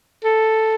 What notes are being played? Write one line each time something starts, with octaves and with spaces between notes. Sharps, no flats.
A4